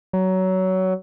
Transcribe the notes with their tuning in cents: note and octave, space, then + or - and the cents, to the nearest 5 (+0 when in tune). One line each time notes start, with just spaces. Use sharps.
F#3 +20